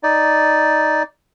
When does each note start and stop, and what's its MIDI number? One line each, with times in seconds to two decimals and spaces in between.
0.03 1.03 63
0.03 1.03 74